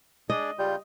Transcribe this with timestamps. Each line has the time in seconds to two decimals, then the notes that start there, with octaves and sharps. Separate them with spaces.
0.30 D4 G#4 D5 D#5
0.59 C#3 G3 F4 G6